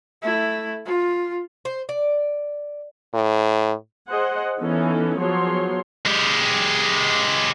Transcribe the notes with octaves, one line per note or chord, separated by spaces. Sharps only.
A3 E4
F4
C5
D5
A2
G#4 C5 D#5 F#5
E3 B3 C#4 D#4 A4
F3 F#3 B3 G#4 C#5 C6
G#3 G4